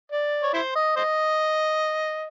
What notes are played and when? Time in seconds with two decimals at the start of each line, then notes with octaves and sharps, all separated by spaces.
0.12 D5
0.43 C#5
0.54 E4 C5
0.75 D#5
0.96 C5 D#5